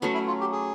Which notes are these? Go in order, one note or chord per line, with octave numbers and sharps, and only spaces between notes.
F#3 A3 B3 C#4
E4
F4
G4
G#4